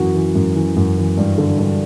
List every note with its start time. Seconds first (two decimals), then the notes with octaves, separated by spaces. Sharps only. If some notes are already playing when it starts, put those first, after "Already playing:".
Already playing: F#2 E3 F#4
0.15 E3
0.35 F#2
0.55 E3
0.76 F#2
0.98 E3
1.17 G2
1.38 D3
1.59 G2